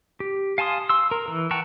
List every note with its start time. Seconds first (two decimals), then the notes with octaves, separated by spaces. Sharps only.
0.20 G4
0.58 F5 G#5 A5 C6 D#6
0.89 C6 E6
1.11 A#4
1.28 E3
1.51 F#5 G5 A5 A#5 C#6